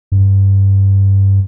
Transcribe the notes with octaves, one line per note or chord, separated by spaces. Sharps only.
G2